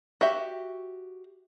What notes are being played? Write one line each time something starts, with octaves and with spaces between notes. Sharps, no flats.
F#4 G4 E5